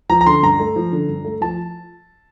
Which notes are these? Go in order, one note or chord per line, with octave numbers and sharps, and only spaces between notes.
F3 A#5
A#5
D3 C6
G2 A#5
A3
F3
D3
G2
A3
F3 A5